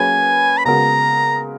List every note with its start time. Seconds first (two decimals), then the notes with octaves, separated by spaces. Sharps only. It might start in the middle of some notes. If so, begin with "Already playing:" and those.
Already playing: F#3 A#3 C#4 G#4 B4 G#5
0.58 B5
0.65 C#3 G#3 B3 F#4 A#4 A#5